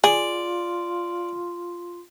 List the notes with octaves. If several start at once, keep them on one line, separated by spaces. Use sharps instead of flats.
F4 G#4 D5